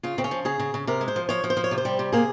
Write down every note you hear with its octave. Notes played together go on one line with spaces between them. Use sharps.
C#3 F4
C#3 C4
C#4
F3
C#3 G#4
C#3
C#3
C3 A#4
G#3
C5
F3
F3 C#5
F3
C5
F3
C#5
C3
C5
G3
C3
A#3 G#4